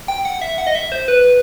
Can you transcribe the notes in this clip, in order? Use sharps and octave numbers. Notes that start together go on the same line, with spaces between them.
G5
F#5
E5
F#5
D#5
E5
C5
B4